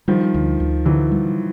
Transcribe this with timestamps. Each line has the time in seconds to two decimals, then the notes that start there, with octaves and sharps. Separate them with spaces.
0.08 D#3 F3 G3
0.34 D2
0.60 D2
0.86 D3 E3 F#3
1.11 G3